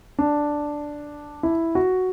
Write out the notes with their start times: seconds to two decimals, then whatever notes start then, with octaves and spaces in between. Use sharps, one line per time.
0.19 D4
1.43 E4
1.75 F#4